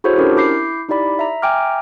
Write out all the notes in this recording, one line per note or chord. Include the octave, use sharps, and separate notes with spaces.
E4 F#4 G#4 A4 C5 C#5
C#4 D4 E4 G4 A#4
E4 D6 G6 C7
D#4 E4 G4 D5 B5
E5 A#5
E5 G5 G#5 A#5 D6 F6